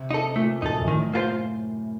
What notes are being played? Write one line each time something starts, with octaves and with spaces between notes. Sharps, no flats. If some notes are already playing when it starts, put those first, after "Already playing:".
Already playing: C3
D#4 A4
A#2 A3
F#2 D#4 A4
F#2
A2 D#3
A#3 F4 A4 C5